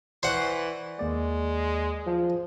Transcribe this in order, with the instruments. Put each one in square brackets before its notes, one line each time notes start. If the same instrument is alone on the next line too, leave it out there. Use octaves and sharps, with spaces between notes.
[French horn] E3 [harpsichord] C5 F#5 [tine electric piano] D5 C#6
[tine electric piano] D#2 A#3 D5 [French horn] G#3
[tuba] F3